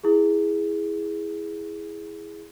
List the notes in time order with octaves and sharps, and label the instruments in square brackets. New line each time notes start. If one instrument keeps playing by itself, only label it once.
[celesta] E4 G#4